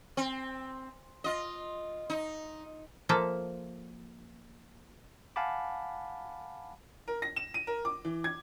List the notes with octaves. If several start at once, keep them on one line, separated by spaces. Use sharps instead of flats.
C4
F4 D#5
D#4
F3 A#3 A4 E5
F5 F#5 G#5 A5 B5 D6
A#4
A#6
E7
D#7
A#4
D6
E3
G#6